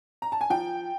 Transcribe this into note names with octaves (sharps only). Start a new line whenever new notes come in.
A#5
A5
G#5
F3 G5